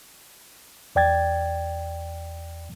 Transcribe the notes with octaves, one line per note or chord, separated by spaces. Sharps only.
E2 D5 G5 G#6 A6